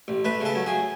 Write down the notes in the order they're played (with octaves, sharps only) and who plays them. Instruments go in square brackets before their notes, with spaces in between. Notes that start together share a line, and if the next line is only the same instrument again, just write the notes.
[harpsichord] A1
A3 B4
C#3 A4
F#3
G#4